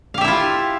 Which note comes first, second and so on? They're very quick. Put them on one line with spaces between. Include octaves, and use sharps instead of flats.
F5 G4 E5 E4 F4